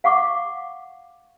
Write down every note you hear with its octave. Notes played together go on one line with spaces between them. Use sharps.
F5 F#5 C#6 D6